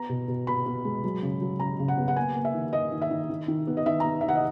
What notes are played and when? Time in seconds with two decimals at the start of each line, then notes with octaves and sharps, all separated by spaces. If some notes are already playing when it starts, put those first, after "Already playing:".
Already playing: B3 A#5
0.09 B2
0.28 B2
0.47 B3 B5
0.66 B3
0.85 G#3
1.04 F#3
1.22 C#3
1.41 F#3
1.60 C#3 A#5
1.79 C#3
1.88 F#5
1.98 B3
2.08 F#5
2.16 A#3 G#5
2.35 A#3
2.45 E5
2.54 D#3
2.73 A#3 D#5
2.92 D#3
3.02 E5
3.11 D#3
3.30 D#3
3.48 D#3
3.67 B3
3.77 D#5
3.86 D#3 E5
4.00 B3 A#5
4.21 E5
4.24 D#3 F#5
4.35 D#5